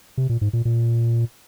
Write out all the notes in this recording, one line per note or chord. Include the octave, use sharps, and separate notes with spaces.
C3
A#2
G#2
A#2
A#2